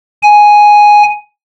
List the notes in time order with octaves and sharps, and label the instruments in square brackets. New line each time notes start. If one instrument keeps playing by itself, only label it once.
[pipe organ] G#5